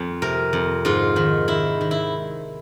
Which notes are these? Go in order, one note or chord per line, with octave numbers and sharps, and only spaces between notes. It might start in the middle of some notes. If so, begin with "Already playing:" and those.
Already playing: F2
C3 A#4
F2
G#2 F4
D#3
D#3 E4
D#3
E4